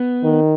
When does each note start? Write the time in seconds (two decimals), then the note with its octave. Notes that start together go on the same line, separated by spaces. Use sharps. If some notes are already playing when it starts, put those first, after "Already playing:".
Already playing: B3
0.23 D#3